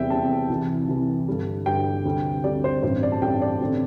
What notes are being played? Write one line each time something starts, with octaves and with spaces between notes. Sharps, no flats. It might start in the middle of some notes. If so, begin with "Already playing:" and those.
Already playing: E2 C3 G3 C4 E5 G5
E2 C3 G3 C4 A5
C2 C3 E3
C2 C3 E3
G2 D3 G3
G2 D3 G3 G5
D2 C3 G3 C4
D2 C3 G3 C4 D5
C5
A1 G2 G3 C4 C5
D5
A5
A1 G2 G3 C4 G5
D5
A1 D3 C4